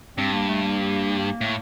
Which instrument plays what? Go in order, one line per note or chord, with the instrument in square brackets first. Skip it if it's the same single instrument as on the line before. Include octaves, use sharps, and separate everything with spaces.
[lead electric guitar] G2 [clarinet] C4
[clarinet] A#3
A3
A#3
[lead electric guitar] A2